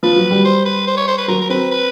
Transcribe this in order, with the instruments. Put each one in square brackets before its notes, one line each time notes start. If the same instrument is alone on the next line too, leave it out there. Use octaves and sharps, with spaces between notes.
[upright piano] F3 [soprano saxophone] B4
[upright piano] F#3
G3
[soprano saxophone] C5
B4
C5
C#5
C5
B4
[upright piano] F#3 [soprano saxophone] A#4
[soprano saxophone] A#4
[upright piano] C4 [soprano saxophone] B4
[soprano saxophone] B4